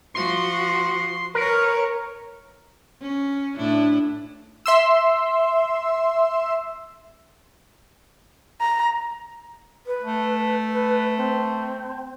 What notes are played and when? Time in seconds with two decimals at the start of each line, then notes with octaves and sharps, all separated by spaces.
0.15 F3 F#4 C6
1.35 A#4 B4 C#5
3.01 C#4
3.56 A2 D4 E4
4.66 E5 C6 E6
8.61 A#5
9.86 B4
10.03 A3
10.72 B4
11.16 C4